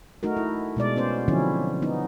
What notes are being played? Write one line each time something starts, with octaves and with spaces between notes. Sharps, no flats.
A3 D#4 F#4 A#4
E4
B2 G#3 D5
B3 C#4 C5
D3 F3 F#3 C4 C#4 E4
B3 D#4